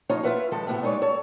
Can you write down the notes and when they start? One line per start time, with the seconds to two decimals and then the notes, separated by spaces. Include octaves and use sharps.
0.09 F3 D#4 F4 C#5 D#5
0.23 E4 F4 G#4 B4 E5 F#5
0.52 D#3 F3 G#3 A4 B4
0.67 A2 C3 B3 E4 F#4
0.82 G3 G#3 D#4 B4 C#5 D5
1.02 A4 C#5